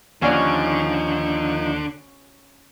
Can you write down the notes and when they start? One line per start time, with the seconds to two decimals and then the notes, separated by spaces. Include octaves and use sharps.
0.22 D#2 D3 F3 C#4 D#4 F#4 D5 F5